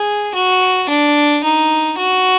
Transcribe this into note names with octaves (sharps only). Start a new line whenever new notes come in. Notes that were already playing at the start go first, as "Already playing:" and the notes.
Already playing: G#4
F#4
D4
D#4
F#4